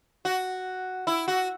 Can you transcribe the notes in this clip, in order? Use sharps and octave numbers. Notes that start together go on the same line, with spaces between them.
F#4
E4
F#4